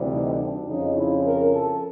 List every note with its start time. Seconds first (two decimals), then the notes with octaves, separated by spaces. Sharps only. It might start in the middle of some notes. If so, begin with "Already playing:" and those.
Already playing: D2 C3 E3 G3
0.11 D#4
0.39 D4
0.67 F2 C#3 F3 D#4
0.96 E4
1.26 A#4
1.54 A4